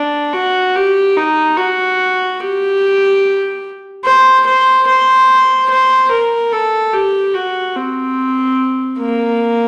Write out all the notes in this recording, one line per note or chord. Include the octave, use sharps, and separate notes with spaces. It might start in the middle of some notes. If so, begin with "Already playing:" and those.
Already playing: D4
F#4
G4
D#4
F#4
G4
C5
C5
C5
C5
A#4
A4
G4
F#4
C4
A#3